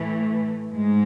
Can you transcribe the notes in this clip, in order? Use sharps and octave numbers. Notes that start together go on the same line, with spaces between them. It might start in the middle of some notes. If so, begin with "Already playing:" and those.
Already playing: A2 E3 A3
G#2 G#3